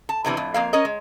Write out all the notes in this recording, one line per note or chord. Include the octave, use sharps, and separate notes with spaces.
A5
E2 C3 E3 D4
F2 A2
F2 A#3 F5
C#4 A#4 D#5
G#3